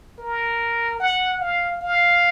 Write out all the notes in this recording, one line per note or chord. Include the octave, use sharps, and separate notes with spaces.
A#4
F#5
F5
F5